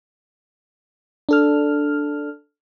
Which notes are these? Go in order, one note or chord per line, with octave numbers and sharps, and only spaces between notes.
D4 A4 F6